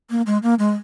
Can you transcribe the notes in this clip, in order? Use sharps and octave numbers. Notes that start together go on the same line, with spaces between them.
A#3
G#3
A#3
G#3